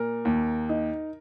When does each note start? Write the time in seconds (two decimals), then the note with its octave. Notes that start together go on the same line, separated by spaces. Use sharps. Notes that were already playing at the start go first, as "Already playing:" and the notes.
Already playing: A#2 A#4
0.25 D#2
0.69 D#4